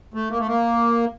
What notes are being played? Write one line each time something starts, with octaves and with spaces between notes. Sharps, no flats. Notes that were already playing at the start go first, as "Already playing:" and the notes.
A3
A#3
A3
A#3